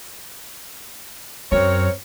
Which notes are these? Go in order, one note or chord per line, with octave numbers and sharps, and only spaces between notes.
F#2 C4 A#4 C#5